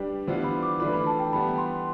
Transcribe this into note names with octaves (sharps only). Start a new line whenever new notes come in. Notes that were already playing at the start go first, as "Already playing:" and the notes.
Already playing: G3 D4 G4 B4
E3 G3 B3 D4 F4 C5
B5
D6
E3 A3 D4 F4 B4 B5
B5
A5
G5
E3 G3 B3 B5
C6